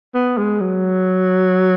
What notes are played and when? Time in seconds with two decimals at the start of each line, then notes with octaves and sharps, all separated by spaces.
0.15 B3
0.38 G#3
0.60 F#3